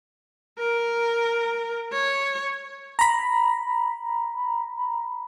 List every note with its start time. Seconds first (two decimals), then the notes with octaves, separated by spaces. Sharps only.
0.59 A#4
1.93 C#5
2.99 A#5 B5